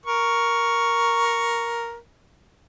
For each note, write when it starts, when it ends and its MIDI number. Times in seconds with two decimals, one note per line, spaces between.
0.06 1.97 70
0.06 1.97 85